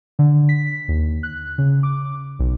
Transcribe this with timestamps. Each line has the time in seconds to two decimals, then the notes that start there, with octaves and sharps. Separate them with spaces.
0.19 D3
0.49 B6
0.88 D#2
1.23 F#6
1.58 C#3
1.83 D6
2.39 B1